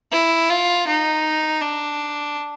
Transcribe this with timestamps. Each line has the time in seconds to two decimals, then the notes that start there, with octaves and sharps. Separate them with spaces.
0.12 E4
0.50 F4
0.87 D#4
1.61 D4